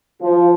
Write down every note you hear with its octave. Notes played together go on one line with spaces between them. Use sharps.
F3